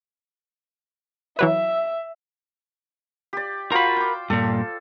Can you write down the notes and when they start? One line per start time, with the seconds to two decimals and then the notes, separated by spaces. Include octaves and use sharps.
1.39 E3 F#3 B4 E5
3.33 G4 D5
3.72 F4 F#4 A#4 C5 B5
3.96 G5 D6
4.30 G2 A#2 A4